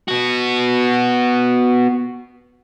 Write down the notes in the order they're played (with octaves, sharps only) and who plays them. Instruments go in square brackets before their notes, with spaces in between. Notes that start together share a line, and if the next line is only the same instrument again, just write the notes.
[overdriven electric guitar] B3 F#4